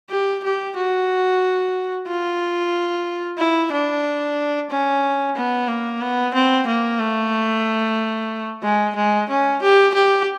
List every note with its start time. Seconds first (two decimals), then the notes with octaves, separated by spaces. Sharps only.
0.10 G4
0.44 G4
0.76 F#4
2.07 F4
3.38 E4
3.71 D4
4.70 C#4
5.36 B3
5.68 A#3
6.01 B3
6.34 C4
6.67 A#3
6.99 A3
8.63 G#3
8.96 G#3
9.29 C#4
9.62 G4
9.94 G4